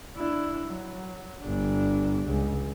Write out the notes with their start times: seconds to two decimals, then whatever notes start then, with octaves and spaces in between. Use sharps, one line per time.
0.17 D4 E4
0.66 F#3
1.42 G1 D4
2.28 C#2